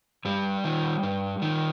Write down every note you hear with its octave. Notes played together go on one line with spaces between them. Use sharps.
G2 G3
D#3
G2
D#3